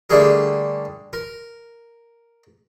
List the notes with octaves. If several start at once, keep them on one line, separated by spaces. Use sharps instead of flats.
D3 G3 A3 A#3 G#4 A#4
A#4